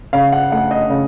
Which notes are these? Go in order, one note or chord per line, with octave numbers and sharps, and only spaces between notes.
C#3 F5
F#5
A3 F#5
D#5
C#3